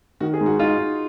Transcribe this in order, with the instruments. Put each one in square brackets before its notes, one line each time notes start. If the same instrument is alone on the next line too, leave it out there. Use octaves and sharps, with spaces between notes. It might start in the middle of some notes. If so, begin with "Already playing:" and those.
[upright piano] D#3 [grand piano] F#4
[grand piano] G#4
[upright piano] G#2
[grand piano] F#4
[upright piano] D#4 [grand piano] F4
[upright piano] D#4